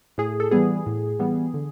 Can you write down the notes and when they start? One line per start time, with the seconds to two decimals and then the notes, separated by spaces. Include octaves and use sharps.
0.18 A2 G#4
0.40 A4
0.51 E3 G3 B3 G#4
0.86 A2
1.19 E3 G3 B3
1.54 D3